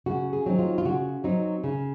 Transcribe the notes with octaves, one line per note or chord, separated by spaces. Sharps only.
C#3 F#4
G#4
F#3 C4 D#4
F4
F4
C#3 F#4
F#3 C4 D#4
C#3